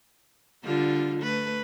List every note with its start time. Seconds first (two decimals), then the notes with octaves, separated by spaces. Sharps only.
0.64 D3 G3 F4
1.20 A3 B4